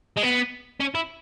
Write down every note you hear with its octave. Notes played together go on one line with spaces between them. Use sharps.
G#3
B3
C#4
E4